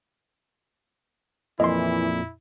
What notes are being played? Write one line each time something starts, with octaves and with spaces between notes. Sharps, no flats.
F2 A#2 E3 E4 D#5 C6